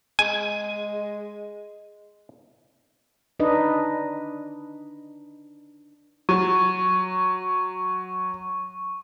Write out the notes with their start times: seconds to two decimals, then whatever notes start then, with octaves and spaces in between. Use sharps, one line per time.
0.19 G#3 G#5
3.40 D4 D#4 B4 D#5
6.29 F#3 C#6